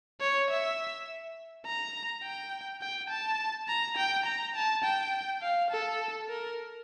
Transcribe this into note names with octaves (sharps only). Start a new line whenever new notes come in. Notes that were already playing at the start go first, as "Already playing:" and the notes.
C#5
E5
A#5
G5
G5
A5
A#5
G5
A#5
A5
G5
F5
A4
A#4